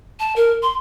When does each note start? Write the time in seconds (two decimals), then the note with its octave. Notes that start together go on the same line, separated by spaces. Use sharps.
0.20 A5
0.36 A#4
0.62 C6